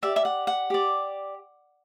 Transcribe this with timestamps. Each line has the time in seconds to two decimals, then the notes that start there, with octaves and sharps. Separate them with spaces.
0.03 G4 D5 E5
0.16 E5
0.25 F#5
0.47 F#5
0.70 G4 D5